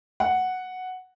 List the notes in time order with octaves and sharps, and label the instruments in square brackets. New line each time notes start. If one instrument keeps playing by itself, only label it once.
[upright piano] F#5